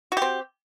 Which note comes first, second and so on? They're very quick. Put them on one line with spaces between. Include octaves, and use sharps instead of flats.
F#4 G4 C4